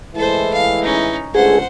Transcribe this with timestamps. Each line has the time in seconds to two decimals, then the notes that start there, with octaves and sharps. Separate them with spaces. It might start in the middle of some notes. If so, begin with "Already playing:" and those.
0.15 A2 E3 G#3 A4 C5
0.54 F5
0.83 C#4 D#4
1.35 C#2 G2 A3 G#4 C5 F#5